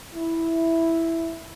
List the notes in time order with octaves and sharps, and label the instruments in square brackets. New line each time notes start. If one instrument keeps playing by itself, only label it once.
[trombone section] E4